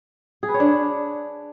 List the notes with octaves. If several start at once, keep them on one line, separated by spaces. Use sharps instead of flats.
G#4
B4
C#5
D4